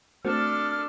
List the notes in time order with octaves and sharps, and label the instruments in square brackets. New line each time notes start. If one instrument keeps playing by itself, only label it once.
[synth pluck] A3 C4 F#4 [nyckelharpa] D4 A4 [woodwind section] F6